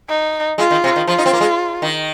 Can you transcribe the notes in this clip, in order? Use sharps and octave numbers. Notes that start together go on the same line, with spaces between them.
D#4
G#3 F4
D#3
C3
D#3
F3 F4
D#4
C4
A#3
G#3
D#3